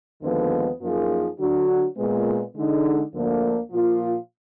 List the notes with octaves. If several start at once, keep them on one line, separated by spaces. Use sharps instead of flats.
D#2 D3 F3 G#3 B3
F#2 F3 A#3 D#4 G#4
D3 F#3 D4 F#4
A#2 G#3 B3
D3 G#3 D#4
D2 D3 F3 A#3 D4
A#2 F3 A#3 F4